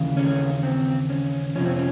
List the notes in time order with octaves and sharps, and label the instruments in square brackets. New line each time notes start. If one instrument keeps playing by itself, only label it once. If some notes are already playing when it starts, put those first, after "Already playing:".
Already playing: [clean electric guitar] D#2 C#3 E3
C#4
C4
C#4
F2 C3 F3 C#4
C4
C#4